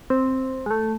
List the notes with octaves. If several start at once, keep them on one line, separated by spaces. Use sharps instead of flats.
C4
G#3
A3